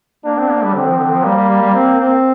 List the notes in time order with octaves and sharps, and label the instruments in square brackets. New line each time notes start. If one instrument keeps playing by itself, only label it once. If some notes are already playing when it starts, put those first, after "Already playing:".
[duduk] A#3 [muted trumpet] D4
[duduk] C4
A#3
G3
[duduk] D3 [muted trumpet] C4
[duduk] F3
D3
F3
[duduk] G3 [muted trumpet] A#3
[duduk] G3
G3
G3
C4
C4